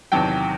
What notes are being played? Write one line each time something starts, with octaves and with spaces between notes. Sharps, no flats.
E2 C3 D#3 F#3 G5 A5